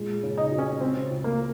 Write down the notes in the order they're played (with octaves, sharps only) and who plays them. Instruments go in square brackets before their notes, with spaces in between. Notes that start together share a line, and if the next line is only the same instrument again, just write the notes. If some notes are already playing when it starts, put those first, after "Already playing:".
Already playing: [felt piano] A#2 G#3
C#3
[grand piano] D#4
[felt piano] F#4
[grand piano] C#4
[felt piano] C#3 [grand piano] C4
[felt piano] C#2
[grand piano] A#3